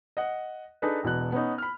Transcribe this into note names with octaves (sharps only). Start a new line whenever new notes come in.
D#5 F#5
D4 D#4 G#4 A4 B4
E1 B2 E3 F#6
B3 C#4 D#4
B5 F6